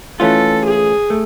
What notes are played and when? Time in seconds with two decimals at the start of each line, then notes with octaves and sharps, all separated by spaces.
0.20 E3 A3 C#4 F4 A4
0.65 G#4
1.10 A3